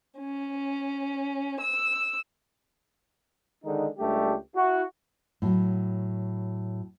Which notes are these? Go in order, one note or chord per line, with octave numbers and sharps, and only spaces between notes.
C#4
E6
D3 D#3 G#3 D#4
C#2 G3 A3 D4 G4
E4 F#4
A2 F#3